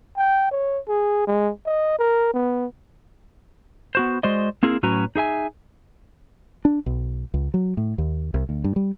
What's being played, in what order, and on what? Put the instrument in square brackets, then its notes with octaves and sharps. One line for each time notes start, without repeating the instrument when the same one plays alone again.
[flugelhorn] G5
C#5
G#4
G#3
D#5
A#4
B3
[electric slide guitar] B3 F#4 C5
G#3 F#4 C5 D5 D#5
A#3 C4 E4 G#4 A#4
A2 F#3 C#4 F#4 B4 A#5
D#4 G#4 E5 G#5
[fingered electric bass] D4
B1
C#2
F#3
A2
D#2
C2
D2
G2
G3